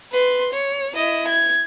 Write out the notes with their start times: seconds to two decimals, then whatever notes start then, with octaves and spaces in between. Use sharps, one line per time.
0.12 B4 C6
0.53 C#5
0.96 E4 D#5
1.28 G#6